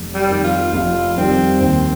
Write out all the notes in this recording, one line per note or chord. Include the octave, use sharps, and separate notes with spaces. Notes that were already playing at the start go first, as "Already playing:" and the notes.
Already playing: F1
G3
F2 D#3
F4
F1 F4
F2 D#3 G3 C4
D#2 C4